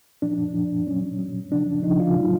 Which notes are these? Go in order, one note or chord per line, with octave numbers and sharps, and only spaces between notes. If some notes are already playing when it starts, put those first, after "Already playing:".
A#2 F3 D4
A#2 F3
A#2 F#3 C#4
A#2 F#3
C#3 F3 D4
C#3 F3 D#4
F4
A2 F#3